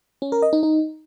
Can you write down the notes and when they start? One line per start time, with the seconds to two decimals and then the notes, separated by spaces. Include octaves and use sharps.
0.22 C#4
0.32 A#4
0.42 D#5
0.53 D#4
0.63 D#4